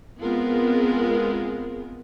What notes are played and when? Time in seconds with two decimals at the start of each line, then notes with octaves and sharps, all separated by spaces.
0.21 G#3 B3 C4 F4 G#4 A#4